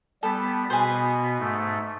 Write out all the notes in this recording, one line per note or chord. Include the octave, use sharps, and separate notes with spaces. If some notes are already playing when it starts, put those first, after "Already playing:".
G3 B3 A4
B2 B3 G#4 C5
G#2 A3